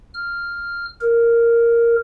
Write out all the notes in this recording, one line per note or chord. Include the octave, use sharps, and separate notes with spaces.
F6
A#4